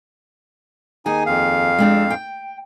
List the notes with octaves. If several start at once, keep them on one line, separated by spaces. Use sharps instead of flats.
D#2 D#4 G#4 G#5
F2 F5
G#3 C4 D4
G5